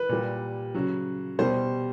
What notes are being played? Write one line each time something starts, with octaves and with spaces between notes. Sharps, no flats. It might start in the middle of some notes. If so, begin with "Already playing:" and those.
Already playing: B4
A#2 G3
C#3 F#3
B2 G3 C5